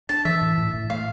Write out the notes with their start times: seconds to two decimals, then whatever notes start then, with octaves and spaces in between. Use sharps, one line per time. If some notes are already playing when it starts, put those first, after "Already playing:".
0.09 D4 A5
0.25 E3 E5
0.41 A2
0.58 A2
0.74 A2
0.90 A3 F5